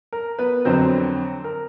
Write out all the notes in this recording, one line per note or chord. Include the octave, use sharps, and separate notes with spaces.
A#4
B3 B4
F2 D3 F#3 C4 C5
A#4